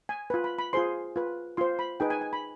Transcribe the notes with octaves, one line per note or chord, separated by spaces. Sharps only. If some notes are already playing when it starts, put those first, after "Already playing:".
G#5
F4 B4
B5
B5
F4 G#4 C5 C6
F4 B4
F4 C5 C6
B5
D#4 G#4 B4 G5
G#5
G#5
B5